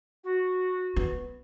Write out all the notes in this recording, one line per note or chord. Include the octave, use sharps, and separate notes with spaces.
F#4
B3